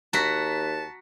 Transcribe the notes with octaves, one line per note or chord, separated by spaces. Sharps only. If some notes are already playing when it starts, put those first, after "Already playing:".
D#2 F#4 A5 A#5 B6